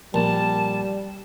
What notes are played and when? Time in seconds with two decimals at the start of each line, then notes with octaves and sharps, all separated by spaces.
0.14 A#1 G3 A5